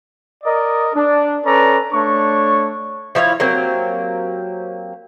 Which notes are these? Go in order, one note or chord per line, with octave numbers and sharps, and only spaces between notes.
A#4 D5 D#5
D4
C#4 A4 B4 D5 A#5
A3 D4 C#5 C#6
F3 E4 C#5 F5
F#3 A#3 C4 G4